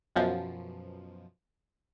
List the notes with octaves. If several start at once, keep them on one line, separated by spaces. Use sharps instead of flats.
F#2 B2 F3